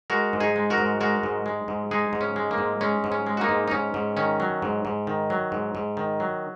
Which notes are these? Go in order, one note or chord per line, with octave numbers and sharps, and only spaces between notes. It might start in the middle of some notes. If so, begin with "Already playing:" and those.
G#3 F#4 A#4
G#2
D#4 G#4
G#3
F#4 A#4
G#2
G#3 F#4 A#4
G#2
G#3
G#2
G#3 D#4 G#4
G#2
C#4
G#3
A#3
G#2
G#3 C#4
G#2
C#4
G#3
F#4
A#3 D#4
G#2
D#4
G#2 C#4
G#2
D#3 C#4
F#3
G#2
G#2
D#3
F#3
G#2
G#2
D#3
F#3